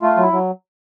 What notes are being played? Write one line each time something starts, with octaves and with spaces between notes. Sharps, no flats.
A3 F4
F#3 E4
F#3